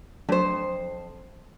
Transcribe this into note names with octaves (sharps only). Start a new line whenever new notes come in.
F2 F#3 A3 D4 C5